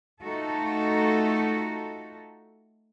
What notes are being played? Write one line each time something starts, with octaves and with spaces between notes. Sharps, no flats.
A3 D#4 F4 F#4 A4